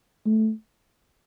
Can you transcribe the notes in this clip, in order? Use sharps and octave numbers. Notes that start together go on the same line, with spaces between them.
A3